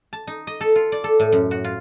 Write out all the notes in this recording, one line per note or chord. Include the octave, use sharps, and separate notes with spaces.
A5
D#4
D#5
A4
F4
D5
A4
A2
F#2
F#4
F4